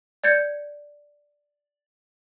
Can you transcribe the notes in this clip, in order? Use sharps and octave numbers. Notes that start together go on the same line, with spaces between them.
D5 G6 G#6 C#7